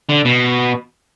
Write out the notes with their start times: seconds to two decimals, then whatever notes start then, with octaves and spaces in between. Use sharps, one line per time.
0.09 D3
0.25 B2